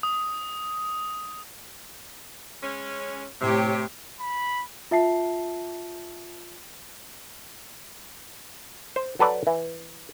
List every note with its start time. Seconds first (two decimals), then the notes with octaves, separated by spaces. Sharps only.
0.03 D#6
2.63 G#3 C#4
3.42 A2 C3 G4 C#5
4.21 B5
4.91 F4 E5 A5 C7
8.96 C5
9.19 F#3 A4 B4 D5
9.47 E3